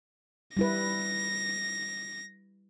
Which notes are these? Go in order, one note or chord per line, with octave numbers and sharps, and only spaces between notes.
G3 E4 B4 A#6